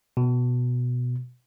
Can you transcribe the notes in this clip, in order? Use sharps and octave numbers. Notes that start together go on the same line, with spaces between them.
B2